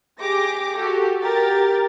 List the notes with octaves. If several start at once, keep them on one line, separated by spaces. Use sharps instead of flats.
G4 G#4 D6 A#6
F#4 G4 A4
G4 A#4 G5 A6